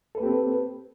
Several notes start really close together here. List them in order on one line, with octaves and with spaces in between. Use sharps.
A4 B4 A#3 G4 C4